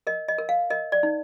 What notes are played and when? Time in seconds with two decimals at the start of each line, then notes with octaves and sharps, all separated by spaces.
0.07 A#4 D#5
0.28 D#5
0.38 A#4
0.49 F5
0.70 A#4 D#5
0.92 D5
1.03 D#4